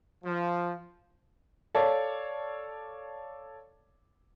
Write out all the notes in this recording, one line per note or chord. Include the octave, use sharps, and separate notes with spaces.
F3
A4 C#5 D5 F5 A5